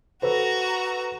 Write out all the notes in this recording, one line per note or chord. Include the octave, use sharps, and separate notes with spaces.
F#4 A4 B4 C5 A#5